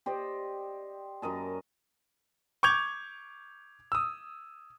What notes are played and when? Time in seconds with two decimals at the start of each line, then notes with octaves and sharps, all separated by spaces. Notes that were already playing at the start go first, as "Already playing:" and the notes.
0.06 G4 C5 D5 D#5
1.22 F#2 A#4 D#5 A5
2.63 C#6 D6 G6 G#6 F7
3.92 D#6 E6